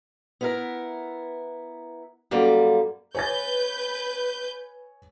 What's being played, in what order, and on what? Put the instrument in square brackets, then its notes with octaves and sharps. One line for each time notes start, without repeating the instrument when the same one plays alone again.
[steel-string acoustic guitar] B3 E4 A#4
[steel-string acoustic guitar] F#2 G3 A#3 [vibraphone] A4 F#5
[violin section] B4 G6 [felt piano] C#5 G#5 A6